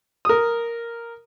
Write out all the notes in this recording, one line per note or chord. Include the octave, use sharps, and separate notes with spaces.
A#4 D#6